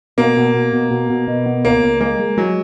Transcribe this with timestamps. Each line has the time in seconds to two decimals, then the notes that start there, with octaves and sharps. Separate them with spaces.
0.18 B2 A#3
0.36 B2
0.55 B2
0.73 B2
0.91 B2
1.10 B2
1.28 B2
1.46 B3
1.65 C#2 A#3
1.83 C#2
2.01 G#3 A#3
2.19 G#3
2.37 F#3 G#3